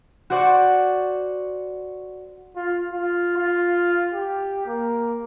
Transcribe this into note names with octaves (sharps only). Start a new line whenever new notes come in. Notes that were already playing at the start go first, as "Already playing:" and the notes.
F#4 C5 D5 F#5 C#6
F4
F4
F4
G4
A#3